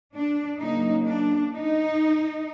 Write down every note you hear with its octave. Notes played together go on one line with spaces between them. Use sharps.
D4
C#3 F#3 A#3 D#4
D4
D#4